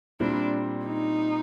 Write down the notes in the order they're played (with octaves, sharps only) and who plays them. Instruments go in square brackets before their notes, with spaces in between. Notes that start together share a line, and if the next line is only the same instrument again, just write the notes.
[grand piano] A#2 G3 C4 E4 [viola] D4
[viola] D#4